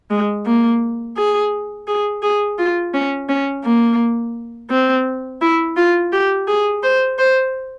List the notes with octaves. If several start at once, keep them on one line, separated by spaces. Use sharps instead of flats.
G#3
A#3
G#4
G#4
G#4
F4
C#4
C#4
A#3
C4
E4
F4
G4
G#4
C5
C5